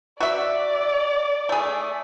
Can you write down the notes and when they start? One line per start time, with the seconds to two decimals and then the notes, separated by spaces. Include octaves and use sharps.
0.20 F#4 D5 E5
1.49 A3 G#4